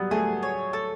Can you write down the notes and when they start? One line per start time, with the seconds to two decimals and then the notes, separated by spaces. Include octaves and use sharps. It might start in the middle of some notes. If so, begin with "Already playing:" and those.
Already playing: F#3 G3 B3
0.11 A3 G#4
0.43 C#5
0.73 A4